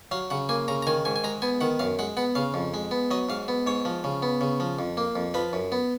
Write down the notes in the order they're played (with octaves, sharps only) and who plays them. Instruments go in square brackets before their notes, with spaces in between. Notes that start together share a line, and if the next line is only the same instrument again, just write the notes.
[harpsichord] F#3 F5
C#3 F#5
A#3 G#5
C#3 A#5
A#5
D#3 G#5
G#2 G#5
G#5
G#3 A#5
B3 G#5
D#3 F#5
F#2 F5
G#3 F#5
B3 F#5
C#3 F5
F2
G#3
B3
F#3 D#5
G#2 F5
B3
G#2 C#5
F3
C#3
B3
C#3
F3
F2
A#3
F2
F3 B4
F#2
B3